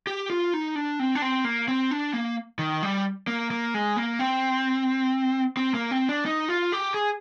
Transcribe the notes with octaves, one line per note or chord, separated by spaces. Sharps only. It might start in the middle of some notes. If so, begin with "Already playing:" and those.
G4
F4
D#4
D4
C4
D4
C4
A#3
C4
D4
A#3
D#3
G3
A#3
A#3
G#3
A#3
C4
C4
A#3
C4
D4
D#4
F4
G4
G#4